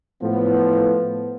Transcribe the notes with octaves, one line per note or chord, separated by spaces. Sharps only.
A2 F3 B3